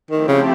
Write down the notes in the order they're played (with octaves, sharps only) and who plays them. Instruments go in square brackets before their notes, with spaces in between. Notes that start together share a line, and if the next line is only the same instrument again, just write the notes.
[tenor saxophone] D#3 [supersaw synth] F3 A3 C4 E4 G4
[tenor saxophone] C#3